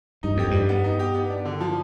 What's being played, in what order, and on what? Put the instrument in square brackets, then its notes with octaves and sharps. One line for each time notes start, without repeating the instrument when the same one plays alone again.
[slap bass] G2 [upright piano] D#4
[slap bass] F2 [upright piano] G4
[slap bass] G2 [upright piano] G3
[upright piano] B3
D#4
G4
B3
D4
D3
F3